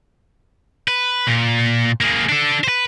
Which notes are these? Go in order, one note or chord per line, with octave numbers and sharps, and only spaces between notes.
B4
A#2
A#3 G#4
D4 A4
B4 C5